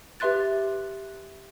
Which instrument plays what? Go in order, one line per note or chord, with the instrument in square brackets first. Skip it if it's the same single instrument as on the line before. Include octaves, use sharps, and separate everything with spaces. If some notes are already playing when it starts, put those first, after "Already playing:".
[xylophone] G4 B4 E5 C6 F#6 A6